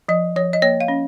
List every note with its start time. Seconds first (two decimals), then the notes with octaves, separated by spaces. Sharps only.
0.08 F3 D#5
0.36 F3 C#5
0.53 D#5
0.62 A#3 C#5
0.81 F5
0.88 C#4